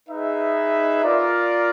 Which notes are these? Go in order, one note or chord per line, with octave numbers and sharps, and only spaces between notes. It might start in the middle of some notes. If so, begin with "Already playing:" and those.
D#4 G#4 B4 E5
F4 A#4 D5